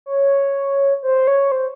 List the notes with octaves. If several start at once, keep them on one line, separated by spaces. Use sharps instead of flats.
C#5
C5
C#5
C5